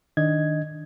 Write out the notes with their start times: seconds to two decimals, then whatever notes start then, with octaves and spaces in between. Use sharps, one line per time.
0.17 D#3 D4 D#5 G#6